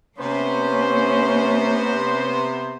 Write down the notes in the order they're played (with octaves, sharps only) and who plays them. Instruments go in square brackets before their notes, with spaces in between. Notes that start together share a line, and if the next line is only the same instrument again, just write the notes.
[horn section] C3 B3 C5 [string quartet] A#3 C#4